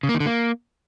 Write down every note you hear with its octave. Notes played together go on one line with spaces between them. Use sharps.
C#3
A#3
D#3
D3
A#3